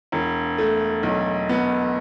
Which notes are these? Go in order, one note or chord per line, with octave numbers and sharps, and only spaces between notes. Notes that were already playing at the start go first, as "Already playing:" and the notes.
E1
A3
B1
B3